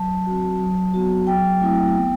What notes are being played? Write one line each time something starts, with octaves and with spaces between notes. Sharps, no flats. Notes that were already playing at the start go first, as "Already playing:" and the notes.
Already playing: F#3 A5
C4 F#4
F#3
B3 F#4
F#3 G5
A3 C4 E4
B3